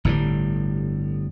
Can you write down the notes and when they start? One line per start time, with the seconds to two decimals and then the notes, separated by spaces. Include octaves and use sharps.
0.05 G1 A2 C#3 G3